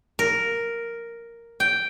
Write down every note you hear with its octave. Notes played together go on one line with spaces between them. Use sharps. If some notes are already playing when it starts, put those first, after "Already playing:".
A#4
G5